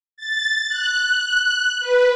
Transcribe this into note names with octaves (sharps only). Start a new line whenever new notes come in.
A6
F#6
B4